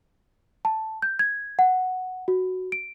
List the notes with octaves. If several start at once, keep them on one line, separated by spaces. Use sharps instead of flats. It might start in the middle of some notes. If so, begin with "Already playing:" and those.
A5
G6
G#6
F#5
F#4
D7